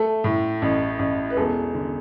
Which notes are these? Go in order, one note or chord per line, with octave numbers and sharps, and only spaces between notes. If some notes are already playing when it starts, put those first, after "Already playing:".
Already playing: A3 A4
A2
A1
A1
B4
E1 A4
D3